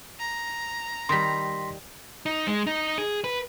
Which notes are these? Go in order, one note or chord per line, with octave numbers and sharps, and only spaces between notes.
A#5
D#3 G3 C6 A#6 B6
D#4
G#3
D#4
G#4
B4